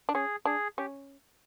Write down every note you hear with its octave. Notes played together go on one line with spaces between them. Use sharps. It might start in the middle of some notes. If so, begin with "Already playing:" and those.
D4
C#4 G#4
D4 G#4
C#4 G4